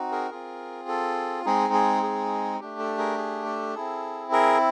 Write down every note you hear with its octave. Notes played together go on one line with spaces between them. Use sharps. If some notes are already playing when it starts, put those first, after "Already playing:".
Already playing: C4 D#4 F#4
G#4 A#4
C4 F4 G#4
A4
G#3 C4 D#4 G#4
G#4
G#4
A3 D4 G4
A4
G#4 A#4
G#4
A4
C4 E4 G#4
G#4 A#4